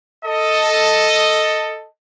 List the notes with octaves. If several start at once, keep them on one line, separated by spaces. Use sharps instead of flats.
A4 D#5